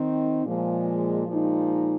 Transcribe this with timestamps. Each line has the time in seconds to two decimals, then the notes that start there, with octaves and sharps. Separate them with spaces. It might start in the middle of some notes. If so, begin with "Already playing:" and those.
Already playing: D#3 C4 D#4
0.45 A#2 F3 G#3
1.28 A#2 F3 G#3 D#4